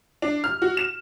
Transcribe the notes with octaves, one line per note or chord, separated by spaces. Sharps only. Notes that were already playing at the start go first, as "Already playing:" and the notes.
D4
F6
F#4
E7